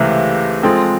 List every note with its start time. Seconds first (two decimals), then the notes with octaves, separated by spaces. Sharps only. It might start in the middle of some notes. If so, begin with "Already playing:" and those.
Already playing: C#2 C3 E3 A3
0.63 F3 G#3 C4 F4 A4